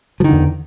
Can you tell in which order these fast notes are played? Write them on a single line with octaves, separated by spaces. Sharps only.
F3 D#3 D3 E2